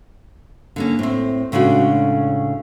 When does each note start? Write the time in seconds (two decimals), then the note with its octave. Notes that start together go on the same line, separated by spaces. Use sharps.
0.76 D3 A#3 C#4
0.99 A2 C4
1.52 A2 C#3 G#3 D4 F#4